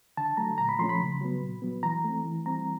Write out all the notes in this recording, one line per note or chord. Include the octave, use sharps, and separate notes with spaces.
D3 A5
F#3 A3 A#5
A#2 A#5
B5
F3 A3 C#4 C6
B5
C#3
F#3 B3
A#2
F#3 B3
E3 A#5
A3 C4
E3
G3 C4 A#5